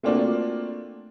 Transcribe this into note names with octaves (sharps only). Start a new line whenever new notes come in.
A3 A#3 C4 D4 F4 F#4